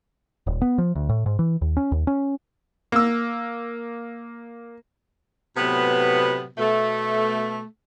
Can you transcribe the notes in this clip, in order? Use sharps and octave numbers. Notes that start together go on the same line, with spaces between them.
D#1
B3
F3
D2
A2
G#2
E3
D#2
C#4
D#2
C#4
A#3 E6
A2 C3 F#3 B3
B2 A3